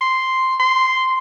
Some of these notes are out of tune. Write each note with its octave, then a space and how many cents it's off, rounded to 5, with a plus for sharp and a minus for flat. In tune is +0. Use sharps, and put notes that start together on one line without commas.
C6 +0
C6 -5